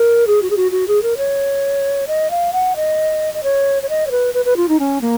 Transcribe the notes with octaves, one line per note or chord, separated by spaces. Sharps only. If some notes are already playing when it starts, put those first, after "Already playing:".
Already playing: A#4
G#4
F#4
G#4
F#4
F#4
G#4
A#4
C#5
D#5
F5
F#5
D#5
D#5
C#5
C#5
D#5
C#5
B4
B4
B4
F4
D#4
C#4
A#3